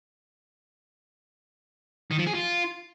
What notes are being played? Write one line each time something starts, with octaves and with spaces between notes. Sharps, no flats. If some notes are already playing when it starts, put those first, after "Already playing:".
D#3
F3
G#4
F4